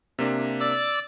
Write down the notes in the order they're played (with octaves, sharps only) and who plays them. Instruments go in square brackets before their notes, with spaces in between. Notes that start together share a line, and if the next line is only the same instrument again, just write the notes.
[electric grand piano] C3 A#3 D4
[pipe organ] D5 D6 E6